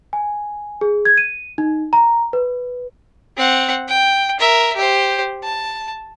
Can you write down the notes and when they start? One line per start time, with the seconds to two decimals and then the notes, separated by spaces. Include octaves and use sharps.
0.13 G#5
0.81 G#4
1.05 G#6
1.18 D#7
1.58 D#4
1.93 A#5
2.33 B4
3.37 C4 F#5
3.88 G5
4.39 A#4 E5
4.76 G4 C5
5.43 A5